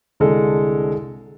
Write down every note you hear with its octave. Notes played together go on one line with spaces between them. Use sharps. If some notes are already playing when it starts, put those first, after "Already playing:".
C2 D3 G#3 A4